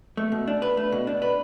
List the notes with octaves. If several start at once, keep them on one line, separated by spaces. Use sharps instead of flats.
A3
B2
D4
B4
A3
B2
D4
B4